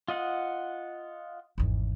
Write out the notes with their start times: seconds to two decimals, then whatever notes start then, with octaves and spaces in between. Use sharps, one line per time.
0.08 F4 D#5 F#5
1.58 G#1 E2